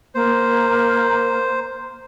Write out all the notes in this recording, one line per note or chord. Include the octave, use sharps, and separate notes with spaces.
A#3 C5